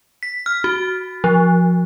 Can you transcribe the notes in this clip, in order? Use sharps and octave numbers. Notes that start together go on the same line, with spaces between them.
B6
F6
F#4
F3